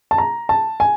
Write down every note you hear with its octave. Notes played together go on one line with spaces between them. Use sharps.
A5
A#5
A5
G#5